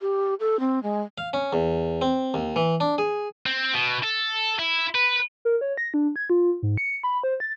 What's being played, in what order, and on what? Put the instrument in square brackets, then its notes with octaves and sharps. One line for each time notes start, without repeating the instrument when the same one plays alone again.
[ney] G4
A4
C4
G#3
[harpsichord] F5
C#4
E2
C4
D#2
E3
D4
G#4
[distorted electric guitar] C4
B2
A4
E4
B4
[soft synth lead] A#4
C#5
A#6
D4
G#6
F4
G#2
C#7
B5
C5
A6